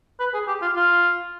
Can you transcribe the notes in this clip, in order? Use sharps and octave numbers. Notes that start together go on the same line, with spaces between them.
B4
G#4
G4
F4
F4